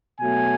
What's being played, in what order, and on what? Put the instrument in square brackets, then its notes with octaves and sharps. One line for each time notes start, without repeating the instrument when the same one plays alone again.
[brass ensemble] B2 F#3 A3 G#5